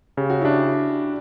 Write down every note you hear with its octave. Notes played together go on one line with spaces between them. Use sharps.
C#3 G4
F#4
D4 E4 G4